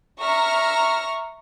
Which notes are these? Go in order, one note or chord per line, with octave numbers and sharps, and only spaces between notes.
E5 A#5 C#6 F6 A#6